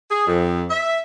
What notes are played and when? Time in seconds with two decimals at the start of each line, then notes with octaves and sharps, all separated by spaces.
0.11 G#4
0.27 F2
0.71 E5